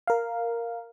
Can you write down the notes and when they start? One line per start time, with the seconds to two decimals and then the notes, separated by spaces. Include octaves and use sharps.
0.07 A#4 F5